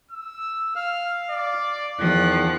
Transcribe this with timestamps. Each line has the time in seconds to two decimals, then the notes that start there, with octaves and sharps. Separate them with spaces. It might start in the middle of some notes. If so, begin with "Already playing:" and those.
0.11 E6
0.75 F5 F6
1.30 D5
1.99 E2 D#3 F3 F#6